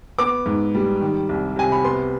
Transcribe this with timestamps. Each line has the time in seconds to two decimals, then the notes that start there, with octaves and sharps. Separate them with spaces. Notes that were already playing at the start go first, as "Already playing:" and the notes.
0.19 B3 D6
0.46 G#2
0.75 G3
1.01 D#3
1.29 C2
1.56 C3 G#5
1.72 B5
1.84 B3 C6